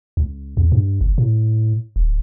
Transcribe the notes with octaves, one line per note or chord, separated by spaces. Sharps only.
C#2
E2
G2
G1
A2
D1